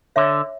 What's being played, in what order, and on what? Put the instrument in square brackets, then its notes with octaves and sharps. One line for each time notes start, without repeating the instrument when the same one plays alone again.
[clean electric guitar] D3 [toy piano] C#5 E5